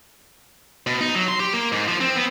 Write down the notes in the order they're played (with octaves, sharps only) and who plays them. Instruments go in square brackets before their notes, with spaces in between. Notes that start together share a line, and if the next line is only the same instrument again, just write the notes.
[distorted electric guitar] B2
D#4
F#3
C6
G4
A#3
G#2
F3
C4
B3